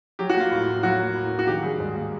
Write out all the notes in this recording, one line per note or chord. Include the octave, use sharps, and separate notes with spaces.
F#3 G4
F#4
A#3 F4
A2
A2
F#3 F#4
A#3
A2
A2
F#4
D#3 G4
G3 G#4
G#2
A#3